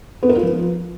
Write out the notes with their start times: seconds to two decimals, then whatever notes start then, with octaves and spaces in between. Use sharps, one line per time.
0.23 B3
0.29 A#4
0.36 F4
0.43 F3